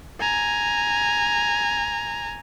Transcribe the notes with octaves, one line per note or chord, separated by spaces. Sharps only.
G#5 A#5